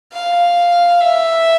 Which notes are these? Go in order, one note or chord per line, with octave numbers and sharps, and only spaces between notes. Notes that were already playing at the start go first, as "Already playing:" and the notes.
F5
E5